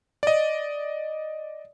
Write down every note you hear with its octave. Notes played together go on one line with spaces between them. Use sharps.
D5 D#5